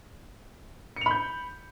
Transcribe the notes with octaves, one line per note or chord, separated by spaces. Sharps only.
B5 G6 C#7 F7